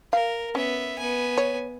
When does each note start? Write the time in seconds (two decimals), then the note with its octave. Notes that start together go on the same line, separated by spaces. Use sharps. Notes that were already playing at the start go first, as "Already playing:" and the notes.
0.13 A#4 F5
0.55 B3 C#4 E5
0.99 B3 G#5
1.38 C#5